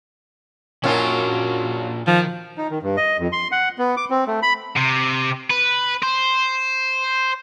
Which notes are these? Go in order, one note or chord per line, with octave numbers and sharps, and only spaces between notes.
F#2 A#2 D#3 F#3 C#4 D4 F4
D#3 F3
D#4
D#3
G2
D#5
F2
C6
F#5
B3
D6
C4
A3
B5
C3
B4
C5